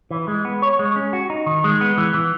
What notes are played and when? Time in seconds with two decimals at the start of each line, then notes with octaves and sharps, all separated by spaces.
0.11 E3
0.28 G#3
0.45 B3
0.62 C#5
0.79 G#3
0.96 C#4
1.13 F#4
1.30 D#4
1.46 D#3
1.64 G#3
1.81 B3
1.98 E3
2.14 E3